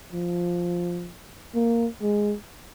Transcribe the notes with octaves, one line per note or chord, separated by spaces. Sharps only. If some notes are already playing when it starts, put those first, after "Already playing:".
F3
A#3
G#3